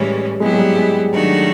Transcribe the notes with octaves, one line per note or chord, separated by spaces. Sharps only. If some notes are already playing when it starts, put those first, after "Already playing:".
Already playing: A2 E3 G3 G#3 C#4
F#3 G#3 B3 E4 G4
G#3
G3
G#3
D#3 F#3 A3 D4 F#4